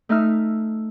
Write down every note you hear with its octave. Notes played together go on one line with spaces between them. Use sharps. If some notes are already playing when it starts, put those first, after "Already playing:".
A3 D#4 E5 F6